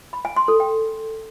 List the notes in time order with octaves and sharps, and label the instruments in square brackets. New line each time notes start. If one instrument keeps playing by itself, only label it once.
[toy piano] B5
G#5
C6
A4
G5